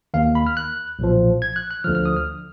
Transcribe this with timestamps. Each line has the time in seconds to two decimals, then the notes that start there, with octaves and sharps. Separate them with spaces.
0.14 D#2 D#3 F5
0.35 B5
0.47 F6
0.57 F#6
0.99 B1 A#2 F3
1.42 G#6
1.56 F#6
1.71 F#6
1.84 F3 F6
1.87 D2 D3
1.95 F6
2.06 D#6
2.16 F6